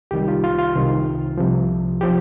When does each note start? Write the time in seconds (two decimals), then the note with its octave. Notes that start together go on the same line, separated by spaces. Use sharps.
0.11 C2 C3 D#3 G3 G4
0.28 F4
0.44 F4
0.59 F4
0.75 C2 C3 D#3
1.38 C2 C3 F3
2.01 F3 G4